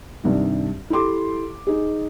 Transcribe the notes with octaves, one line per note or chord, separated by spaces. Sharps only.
C2 G2 D#3
E4 G4 A4 C6 D6
D#4 G#4